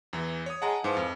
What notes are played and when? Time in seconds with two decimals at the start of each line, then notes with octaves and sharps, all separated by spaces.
0.13 E2 E3
0.46 C#5 D#6
0.62 G#3 F#5 A5 A#5
0.84 G#2 E3 F3
0.97 F2